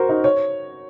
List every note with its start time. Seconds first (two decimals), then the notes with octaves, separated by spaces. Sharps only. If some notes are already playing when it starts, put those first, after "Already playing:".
Already playing: F#4 A#4 C5
0.09 D#4
0.24 C#5